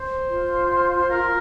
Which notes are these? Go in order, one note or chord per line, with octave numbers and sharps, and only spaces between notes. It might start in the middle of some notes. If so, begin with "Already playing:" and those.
Already playing: C5
F4
A#4